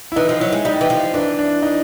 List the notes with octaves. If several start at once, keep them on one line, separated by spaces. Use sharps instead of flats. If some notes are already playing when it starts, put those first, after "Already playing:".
E4
E3 D#4
F3
F#3 E4
G#3
G3 D#4
E3
F3
E3 D4
D4
D#4